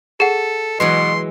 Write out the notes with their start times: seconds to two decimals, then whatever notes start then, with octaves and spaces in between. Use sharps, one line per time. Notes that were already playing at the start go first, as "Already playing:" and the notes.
0.20 G#4 A4 F#5
0.80 B2 E3 F#3 G#3 C6